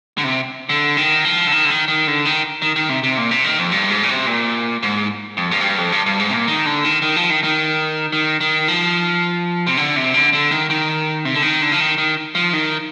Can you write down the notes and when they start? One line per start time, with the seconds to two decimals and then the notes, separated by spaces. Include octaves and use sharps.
0.18 D3
0.24 C3
0.69 D3
0.97 D#3
1.25 F3
1.47 D3
1.52 D#3
1.65 D3
1.70 D#3
1.88 D#3
2.07 D3
2.25 D#3
2.62 D#3
2.76 D#3
2.89 C3
3.03 C3
3.17 A#2
3.31 C3
3.44 D#3
3.58 F2
3.72 G2
3.90 G#2
4.03 A#2
4.09 C3
4.27 A#2
4.83 G#2
5.37 F2
5.51 G2
5.60 G#2
5.64 G2
5.78 F2
5.92 G2
6.06 G2
6.19 G#2
6.29 C3
6.34 A#2
6.47 D#3
6.66 D3
6.85 D#3
7.02 D#3
7.16 F3
7.30 D#3
7.44 D#3
8.12 D#3
8.40 D#3
8.68 F3
9.67 C3
9.77 D3
9.96 C3
10.14 D3
10.33 D3
10.51 D#3
10.70 D#3
11.25 C3
11.34 D3
11.42 D#3
11.62 D3
11.72 F3
11.80 D#3
11.98 D#3
12.35 F3
12.53 D#3